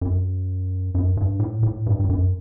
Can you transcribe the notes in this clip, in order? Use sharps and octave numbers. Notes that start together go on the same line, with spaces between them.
F#2
F#2
G2
A2
A2
G2
G2
F#2